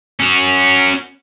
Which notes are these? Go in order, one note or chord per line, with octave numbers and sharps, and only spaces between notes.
C#4 F#4